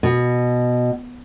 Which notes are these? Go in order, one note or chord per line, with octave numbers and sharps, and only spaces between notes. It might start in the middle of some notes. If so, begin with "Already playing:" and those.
B2